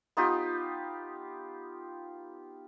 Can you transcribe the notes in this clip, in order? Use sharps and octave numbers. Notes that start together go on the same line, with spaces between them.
B3 D#4 F4 G4